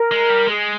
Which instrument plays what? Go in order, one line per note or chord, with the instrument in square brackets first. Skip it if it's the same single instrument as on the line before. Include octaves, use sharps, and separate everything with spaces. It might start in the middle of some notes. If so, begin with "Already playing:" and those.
Already playing: [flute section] A#4
[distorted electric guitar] G#3
G3
[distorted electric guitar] G#3 [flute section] G#4